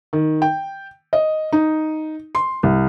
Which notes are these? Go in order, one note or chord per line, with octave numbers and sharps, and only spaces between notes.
D#3
G5
D#5
D#4
C6
C2